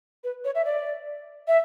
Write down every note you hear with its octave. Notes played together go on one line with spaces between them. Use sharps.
B4
C#5
E5
D5
E5